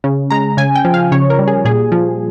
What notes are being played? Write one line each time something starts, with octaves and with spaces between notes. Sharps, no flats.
C#3
G#3 A#5
C#3 G#5
G5
F3
F5
C#3 C#5
A#4
G3
G#4
A#2 G#4
F3